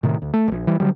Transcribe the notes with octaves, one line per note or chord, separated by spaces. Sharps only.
A2 C3 D#3
D2
A3
D#1 A#1
E3 G3
D3 F#3 G3